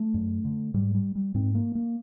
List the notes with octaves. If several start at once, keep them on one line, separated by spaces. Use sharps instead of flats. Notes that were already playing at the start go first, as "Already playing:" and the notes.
Already playing: A3
F#2
D3
G#2 G3
G3
G3
G#2 C4
A#3
A#3